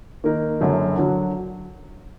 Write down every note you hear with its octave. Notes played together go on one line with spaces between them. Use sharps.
D#3 A#3 D#4 A#4
F#1 F#2 D3 F#3
D3 F#3